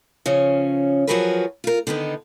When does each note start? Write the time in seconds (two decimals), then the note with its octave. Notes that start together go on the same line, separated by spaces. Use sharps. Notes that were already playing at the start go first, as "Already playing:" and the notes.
0.26 C#3 F3 C#4
1.07 F3 F#3 F#4 G#4 A#4 B4
1.64 F4 A#4
1.87 D3 D#3 B3 D#4